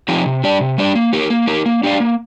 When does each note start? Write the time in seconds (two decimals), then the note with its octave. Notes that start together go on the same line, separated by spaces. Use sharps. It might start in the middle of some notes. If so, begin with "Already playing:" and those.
0.08 F3 C4 D#4 G4
0.26 C3
0.44 G3 D4 G4 D5
0.61 C3
0.78 G3 D4 G4 D5
0.95 A#3
1.13 D#4 G4 A#4
1.30 A#3
1.47 D#4 G4 A#4
1.66 A#3
1.83 D4 G4 D5 F5
2.00 A#3